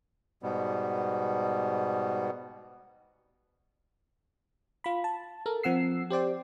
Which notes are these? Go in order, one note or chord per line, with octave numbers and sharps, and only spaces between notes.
G#2 B2 G3 B3
F4 B5
A5
A4 A#4
F3 C4 F#5 E6 C7
G4 C5 D5 G5